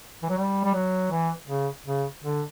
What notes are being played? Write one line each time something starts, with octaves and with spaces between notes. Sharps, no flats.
E3
F#3
G3
G3
F#3
E3
C#3
C#3
D3